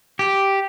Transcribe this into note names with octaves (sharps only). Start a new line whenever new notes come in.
G4